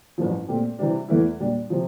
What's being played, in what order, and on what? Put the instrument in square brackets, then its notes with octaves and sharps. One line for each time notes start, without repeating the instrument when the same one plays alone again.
[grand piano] A1 G2 F3
A#2 A3 C4 G4
C3 E3 G3 D4
E2 E3 A3 E4
A#2 G3 D4
C3 F3